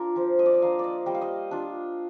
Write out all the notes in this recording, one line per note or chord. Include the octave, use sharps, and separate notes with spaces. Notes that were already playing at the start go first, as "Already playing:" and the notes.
Already playing: D4 F4 A#4
F3 C5
D#5
D5
D#5
A#3 D4 F5
D5 D#5
G3 D#5
F5
D#5
D4 F4